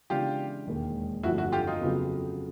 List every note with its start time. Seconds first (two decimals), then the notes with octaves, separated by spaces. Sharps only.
0.10 C#3 E3 G#3 B3 D4 F4 G4
0.67 E1 D#2 D#3 G#3
1.23 G1 F2 D3 F3 A3 E4 F#4
1.38 E4 F#4
1.52 F4 G4
1.67 D#4 F4
1.81 F2 C#3 F#3 B3